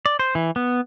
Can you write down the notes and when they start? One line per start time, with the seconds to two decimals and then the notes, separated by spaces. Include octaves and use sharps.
0.06 D5
0.19 C5
0.35 E3
0.56 B3